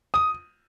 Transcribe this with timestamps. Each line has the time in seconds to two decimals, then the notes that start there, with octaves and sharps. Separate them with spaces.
0.14 D#6